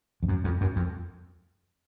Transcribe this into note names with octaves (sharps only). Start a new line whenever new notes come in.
F2
F#2
F2
F#2
F2